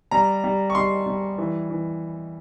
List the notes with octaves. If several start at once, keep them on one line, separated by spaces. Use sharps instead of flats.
G3 A#5
G3
C#6
G3 C6
G3
E3
E3